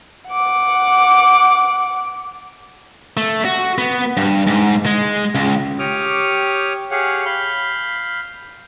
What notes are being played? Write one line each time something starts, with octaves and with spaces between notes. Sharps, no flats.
F#5 D6
A3
F#4
B3
G2
G#2
G#3
C#2
G4 C#5 D6 D#6 F6
G4 G#4 C#5 F5 F#5
F5 B5 G6